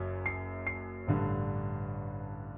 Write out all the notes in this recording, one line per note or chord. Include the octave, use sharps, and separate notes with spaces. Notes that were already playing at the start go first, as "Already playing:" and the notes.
Already playing: F#1 F#2 F#3
C7
C7
A1 G2 D3